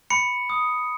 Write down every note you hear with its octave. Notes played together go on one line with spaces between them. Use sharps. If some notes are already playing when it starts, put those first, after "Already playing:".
B5 C#7
D#6